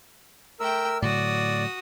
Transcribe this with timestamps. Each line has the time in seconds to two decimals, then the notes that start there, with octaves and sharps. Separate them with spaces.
0.60 A3 A#4 G5 E6
1.02 A2 D3 F#3 F#4 D5 D#6